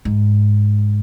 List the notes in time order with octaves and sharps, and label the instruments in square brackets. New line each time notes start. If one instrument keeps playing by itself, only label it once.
[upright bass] G#2